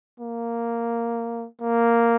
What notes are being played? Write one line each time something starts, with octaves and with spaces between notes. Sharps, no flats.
A#3
A#3